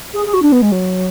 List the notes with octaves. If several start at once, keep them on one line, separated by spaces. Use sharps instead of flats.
G#4
G#4
F#4
D4
B3
G#3
F#3